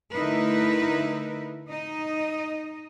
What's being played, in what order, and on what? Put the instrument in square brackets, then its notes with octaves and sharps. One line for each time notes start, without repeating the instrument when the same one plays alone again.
[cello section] D3 A3 D#4 E4 A#4 B4
D#4 D#5